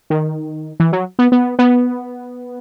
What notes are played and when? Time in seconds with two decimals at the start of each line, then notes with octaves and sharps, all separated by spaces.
0.10 D#3
0.80 E3
0.93 F#3
1.19 B3
1.32 B3
1.59 B3